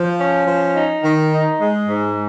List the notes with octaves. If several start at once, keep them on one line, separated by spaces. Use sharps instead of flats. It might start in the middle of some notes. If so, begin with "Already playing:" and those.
Already playing: F3
C#4
F3
D#4
D#3
D#4
G#3
G#2